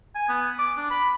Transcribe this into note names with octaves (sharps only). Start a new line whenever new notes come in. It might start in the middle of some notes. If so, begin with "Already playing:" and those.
G#5
B3
D6
D4
B5